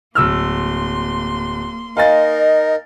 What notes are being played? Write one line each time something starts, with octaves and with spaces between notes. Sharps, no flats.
D1 A#3 C6 E6 F6
D#4 A#4 D#5 F5 G#5 A6